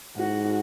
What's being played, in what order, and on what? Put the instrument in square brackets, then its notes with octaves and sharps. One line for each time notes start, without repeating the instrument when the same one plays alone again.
[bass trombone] G#2 [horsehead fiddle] F#4